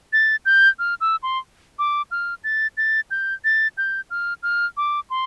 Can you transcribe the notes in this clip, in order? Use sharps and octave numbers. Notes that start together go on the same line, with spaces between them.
A6
G6
F6
E6
C6
D6
F6
A6
A6
G6
A6
G6
F6
F6
D6
C6